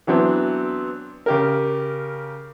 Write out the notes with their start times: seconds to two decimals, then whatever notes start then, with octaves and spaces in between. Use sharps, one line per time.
0.07 E3 F#3 B3 C4 D4
1.26 C#3 G4 A#4